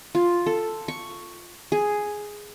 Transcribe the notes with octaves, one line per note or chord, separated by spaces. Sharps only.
F4
A4
C#6
G#4